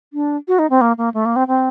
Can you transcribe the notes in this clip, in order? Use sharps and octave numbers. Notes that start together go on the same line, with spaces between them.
D4
F#4
D#4
C4
A#3
A#3
A3
A#3
C4
C4